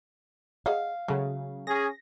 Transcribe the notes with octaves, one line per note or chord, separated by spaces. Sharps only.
G#4 D#5 F5 F#5
C#3 F#3 G#3 A3
C#4 G#4 A#6